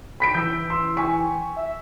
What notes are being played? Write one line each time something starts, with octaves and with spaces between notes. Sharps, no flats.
B5 B6 D7
E3 E6 G6
C6 E6
G5 G#5 C#6 B6
E5